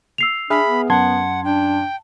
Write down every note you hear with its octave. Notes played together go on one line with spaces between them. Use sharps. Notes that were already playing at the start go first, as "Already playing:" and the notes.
E6 C7 F7
D4 G#4 E5 B5 F6
B3
F#2 F#5 A5 C6 G#6
D4 G5